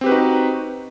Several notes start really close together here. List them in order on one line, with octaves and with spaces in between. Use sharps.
C4 G4 B4 F#4 D#4